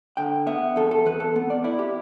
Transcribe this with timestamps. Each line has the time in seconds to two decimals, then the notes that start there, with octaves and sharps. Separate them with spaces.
0.17 D3 G5
0.47 B3 E5
0.76 E2 A4
0.91 A4
1.06 E2 B4
1.20 A4
1.36 B3
1.50 D5
1.64 E4 D5
1.79 G4